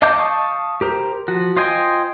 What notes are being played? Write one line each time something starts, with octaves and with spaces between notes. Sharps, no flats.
D#5 F5 A5 D6 G6
F5 A5 C#6 D#6
G4 A#4 C5
F3 F#4
F4 C5 D#5 G5 G#5